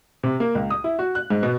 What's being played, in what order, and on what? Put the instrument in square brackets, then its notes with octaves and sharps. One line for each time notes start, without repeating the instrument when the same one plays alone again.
[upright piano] C3
A#3
C#2
D#6
E4
F#4
F#6
G#2
B2